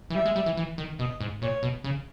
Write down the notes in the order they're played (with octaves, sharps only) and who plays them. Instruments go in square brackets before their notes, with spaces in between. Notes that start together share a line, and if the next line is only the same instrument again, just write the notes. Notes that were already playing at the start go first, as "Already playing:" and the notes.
[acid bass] E3
[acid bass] G3 [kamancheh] E5
[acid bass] G#3
G3
E3
E3
D#3
[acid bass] B2 [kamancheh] D#5
[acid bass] G#2
[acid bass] A#2 [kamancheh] C#5
[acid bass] B2
C#3